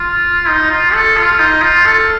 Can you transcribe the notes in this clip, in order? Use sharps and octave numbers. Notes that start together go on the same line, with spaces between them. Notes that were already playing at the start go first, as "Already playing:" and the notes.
Already playing: F4
D#4
F4
A4
F4
D#4
F4
A4